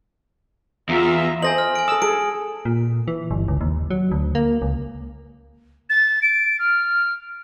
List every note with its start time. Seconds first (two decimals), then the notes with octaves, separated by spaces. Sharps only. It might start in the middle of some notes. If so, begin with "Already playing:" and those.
0.89 E2 F4 E5 A#5
1.42 A4 C5 D#5 G#5 A#6 F#7
1.58 F6
1.75 G#5 D7
1.88 A4 D#6 E6
2.02 G#4 A4 D7
2.65 A#2
3.08 E3
3.31 G1
3.48 C#2
3.61 D#2
3.90 F#3
4.12 D2
4.35 A#3
4.62 C#2
5.89 A6
6.22 D7
6.59 F6